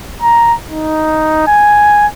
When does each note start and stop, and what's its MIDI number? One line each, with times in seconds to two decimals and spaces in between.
0.22 0.54 82
0.69 1.47 63
1.47 2.07 80